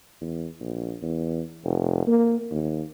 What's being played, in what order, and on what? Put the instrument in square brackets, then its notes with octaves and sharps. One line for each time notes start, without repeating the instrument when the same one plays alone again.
[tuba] E2
A#1
E2
F1
A#3
D#2